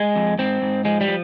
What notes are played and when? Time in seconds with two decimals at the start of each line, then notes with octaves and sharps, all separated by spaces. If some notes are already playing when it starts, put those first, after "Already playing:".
Already playing: G#3
0.16 F2
0.38 G#2 C4
0.62 G#2
0.85 F3 G#3
1.01 G3
1.08 F3